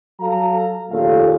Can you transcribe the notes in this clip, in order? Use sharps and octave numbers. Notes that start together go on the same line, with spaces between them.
F#3 A4 F5 A#5
D#2 A#2 C#3 A3 F4 F5